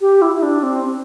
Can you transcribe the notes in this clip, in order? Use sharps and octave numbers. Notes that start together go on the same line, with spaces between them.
G4
E4
E4
D4
C4